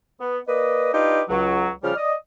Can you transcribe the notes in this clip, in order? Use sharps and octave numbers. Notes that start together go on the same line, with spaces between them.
B3
A#3 B4 D5 D#5
D4 D#4 F4 G4 B4
C#2 F#3
C#3 F3 G3 F6
D5 D#5